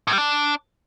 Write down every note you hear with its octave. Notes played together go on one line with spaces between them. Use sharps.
A2
G3
D4